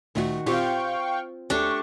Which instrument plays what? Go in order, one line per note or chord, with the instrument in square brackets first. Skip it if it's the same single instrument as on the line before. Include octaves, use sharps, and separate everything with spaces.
[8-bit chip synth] D2 A#2 A3 [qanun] D#3 F#4
[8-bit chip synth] A#2 G4 [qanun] C4 F4 [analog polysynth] F5 G5 C#6
[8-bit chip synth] D2 [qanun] A3 G4 [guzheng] D4 [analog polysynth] C#6